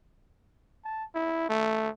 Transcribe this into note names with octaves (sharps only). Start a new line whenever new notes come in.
A5
E4
A3